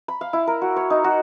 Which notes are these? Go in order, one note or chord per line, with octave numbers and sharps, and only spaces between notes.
B5
F5
E4
A#4
F#4
C#5
D#4
F#4